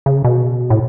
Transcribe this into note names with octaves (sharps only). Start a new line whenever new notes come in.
C#3
B2
A2